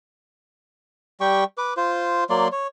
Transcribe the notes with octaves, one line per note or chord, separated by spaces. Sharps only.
G3 G4 G5 C#6
B4 D6
F4 C5
F#3 A#3 D5 C6
C#5